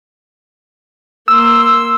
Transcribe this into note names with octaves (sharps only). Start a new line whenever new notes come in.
A#3 C6 E6